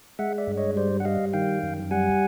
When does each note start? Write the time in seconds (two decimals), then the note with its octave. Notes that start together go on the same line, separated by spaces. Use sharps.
0.19 G#3 E5 F#5
0.38 D5 E5
0.47 G2
0.57 C#5 D#5
0.76 G3 C5 D5
1.00 F#5
1.05 G3 D#5 F5
1.33 D#3 F5 G5
1.63 F#2
1.91 G3 F#5 G#5